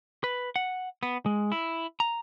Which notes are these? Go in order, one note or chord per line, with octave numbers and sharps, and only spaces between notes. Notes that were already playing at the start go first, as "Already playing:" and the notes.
B4
F#5
B3
G#3
E4
A#5